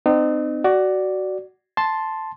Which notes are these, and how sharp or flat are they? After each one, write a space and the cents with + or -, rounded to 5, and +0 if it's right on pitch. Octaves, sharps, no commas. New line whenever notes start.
C4 -35 D#4 -35
F#4 +15 D5 +0
A5 +0 C6 +0